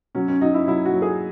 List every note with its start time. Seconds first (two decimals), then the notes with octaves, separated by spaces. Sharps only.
0.15 F#3 C#4
0.28 C#4
0.41 F#3 D#4
0.54 E4
0.67 F#3 E4
0.85 F#4
0.94 F#3
1.02 G#4